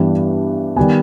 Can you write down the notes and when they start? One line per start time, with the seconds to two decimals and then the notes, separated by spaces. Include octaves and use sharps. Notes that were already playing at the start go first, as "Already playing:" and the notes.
Already playing: G2 E3 G3 B3
0.76 D#3 G3 B3 G#5